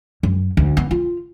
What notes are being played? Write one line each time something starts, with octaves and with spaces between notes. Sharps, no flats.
F#2
D2
B3
F4